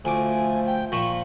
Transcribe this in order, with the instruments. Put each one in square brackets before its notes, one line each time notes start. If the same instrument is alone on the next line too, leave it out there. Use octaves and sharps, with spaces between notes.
[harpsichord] D2 D6 [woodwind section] F3 A3 [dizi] G#5
[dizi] G5
[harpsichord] A#2 F3 [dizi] C#6